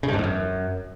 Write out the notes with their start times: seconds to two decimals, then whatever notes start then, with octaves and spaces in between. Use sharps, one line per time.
0.03 C#3
0.08 G2
0.13 G#2
0.18 E2
0.24 F#2